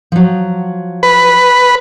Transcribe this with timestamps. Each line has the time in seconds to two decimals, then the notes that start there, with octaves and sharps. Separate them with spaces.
0.12 F3 F#3
1.03 B4